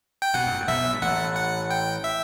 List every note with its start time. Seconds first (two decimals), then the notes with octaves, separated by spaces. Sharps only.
0.22 G5
0.34 B1 B2 F#5
0.46 F#2
0.54 G2
0.60 A2
0.68 B1 B2 E5
0.93 G2
1.01 A1 A2 F#5
1.36 F#5
1.70 G5
2.04 E5